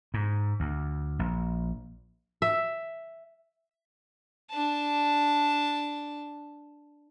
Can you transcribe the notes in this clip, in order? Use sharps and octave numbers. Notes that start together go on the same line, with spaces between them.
G#2
D2
A#1
E5
D4 A5